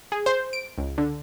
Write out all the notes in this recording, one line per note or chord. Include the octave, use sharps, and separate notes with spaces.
G#4
C5
D7
C#2
D3